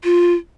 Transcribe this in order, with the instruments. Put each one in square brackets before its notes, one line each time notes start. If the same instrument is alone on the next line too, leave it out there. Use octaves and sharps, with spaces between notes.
[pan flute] F4